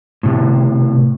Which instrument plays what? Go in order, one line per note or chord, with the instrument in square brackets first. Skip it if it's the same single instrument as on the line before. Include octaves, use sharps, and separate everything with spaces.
[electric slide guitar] A2 C3